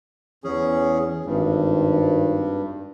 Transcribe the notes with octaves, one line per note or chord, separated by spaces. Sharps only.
E2 E3 C#4 G#4
G#1 G2